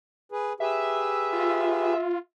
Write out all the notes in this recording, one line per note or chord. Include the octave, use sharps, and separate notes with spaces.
G#4 B4
G4 G#4 B4 E5
F4